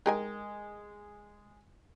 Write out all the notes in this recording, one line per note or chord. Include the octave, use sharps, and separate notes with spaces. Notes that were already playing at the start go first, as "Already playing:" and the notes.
G#3 G4 A#4 G#5